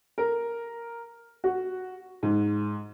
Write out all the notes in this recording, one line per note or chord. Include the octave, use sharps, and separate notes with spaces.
A#4
F#4
G#2